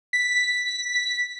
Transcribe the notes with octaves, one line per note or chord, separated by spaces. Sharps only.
B6